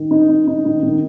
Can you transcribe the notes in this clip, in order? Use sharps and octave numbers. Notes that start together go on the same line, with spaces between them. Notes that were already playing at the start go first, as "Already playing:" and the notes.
Already playing: D#3
D#4
D#4
D#4
D#3
D#3